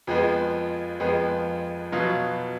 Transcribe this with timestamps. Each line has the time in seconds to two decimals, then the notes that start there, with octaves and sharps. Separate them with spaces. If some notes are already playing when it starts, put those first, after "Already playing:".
0.07 F2 F3 G#3 B3
1.00 F2 F3 G#3 B3
1.92 B2 F#3 B3 F4